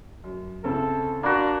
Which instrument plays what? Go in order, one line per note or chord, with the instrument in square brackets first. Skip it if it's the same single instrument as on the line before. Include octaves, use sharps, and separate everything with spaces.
[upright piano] F#2
[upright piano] C#3 C4 E4 [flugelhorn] A4
[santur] A#3 F#4 [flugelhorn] D4 [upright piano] B5 C6